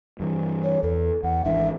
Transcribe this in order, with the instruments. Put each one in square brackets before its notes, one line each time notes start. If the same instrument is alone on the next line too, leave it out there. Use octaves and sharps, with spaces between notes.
[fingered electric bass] G2 E3
[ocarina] C#5
[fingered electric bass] E2 [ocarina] A4
[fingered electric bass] E2 [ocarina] F#5
[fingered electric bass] G#1 E3 D4 [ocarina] E5